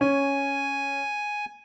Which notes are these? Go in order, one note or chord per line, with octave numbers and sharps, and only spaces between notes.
C#4 G#5